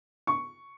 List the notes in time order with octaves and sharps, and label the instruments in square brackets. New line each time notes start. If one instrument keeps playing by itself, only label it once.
[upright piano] C#6